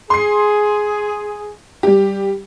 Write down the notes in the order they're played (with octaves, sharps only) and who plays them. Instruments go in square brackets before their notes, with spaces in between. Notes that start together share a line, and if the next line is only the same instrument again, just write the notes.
[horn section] G#4 [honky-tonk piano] C6 C7
[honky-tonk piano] G3 G4